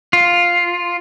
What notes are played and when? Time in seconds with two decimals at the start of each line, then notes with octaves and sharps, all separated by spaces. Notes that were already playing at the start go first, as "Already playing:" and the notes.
0.13 F4